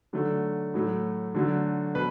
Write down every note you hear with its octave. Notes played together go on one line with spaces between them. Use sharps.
D3 F#3 A3
A2 F#3 A3
D3 F#3 A3
B2 B4